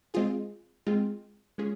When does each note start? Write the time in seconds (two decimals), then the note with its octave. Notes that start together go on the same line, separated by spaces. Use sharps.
0.14 G#3 C4 F4 G#4
0.87 G#3 C4 F4 G#4
1.58 G#3 C#4 F4 G#4